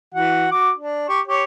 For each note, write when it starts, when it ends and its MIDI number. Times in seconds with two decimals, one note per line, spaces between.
0.14 0.47 52
0.14 0.47 66
0.14 0.47 78
0.51 0.71 66
0.51 0.71 86
0.77 1.07 62
1.09 1.20 67
1.09 1.20 85
1.27 1.44 67
1.27 1.44 73